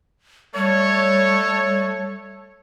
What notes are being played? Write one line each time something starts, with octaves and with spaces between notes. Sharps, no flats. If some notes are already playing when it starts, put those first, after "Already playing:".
G3 A3 A4 C#5